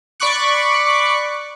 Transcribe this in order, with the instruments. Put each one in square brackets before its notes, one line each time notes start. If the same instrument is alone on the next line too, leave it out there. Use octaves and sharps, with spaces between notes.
[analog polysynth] D5 B5 C#6 D6 F#6 C#7